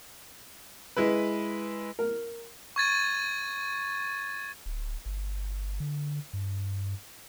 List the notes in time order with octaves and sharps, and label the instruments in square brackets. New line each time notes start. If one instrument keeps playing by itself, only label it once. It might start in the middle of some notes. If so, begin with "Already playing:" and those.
[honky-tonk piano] G#3 E4 B4
[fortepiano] A#4
[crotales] C#6 G#6 A6 D#7
[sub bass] D1
G1
D3
G2